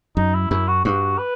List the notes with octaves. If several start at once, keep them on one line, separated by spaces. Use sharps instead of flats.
F#2 D#4
E4
F#2 E4
F#4
G2 F#4
B4